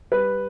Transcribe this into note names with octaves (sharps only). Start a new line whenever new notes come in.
G3 B4